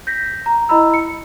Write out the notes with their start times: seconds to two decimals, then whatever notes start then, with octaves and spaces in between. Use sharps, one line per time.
0.07 G6 A#6 B6
0.46 A#5
0.69 E4 D#5 A#5 B5 E6
0.94 C#7